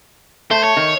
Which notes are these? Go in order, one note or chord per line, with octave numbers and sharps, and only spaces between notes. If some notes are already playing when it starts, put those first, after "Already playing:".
A3 C5
C#5
D#3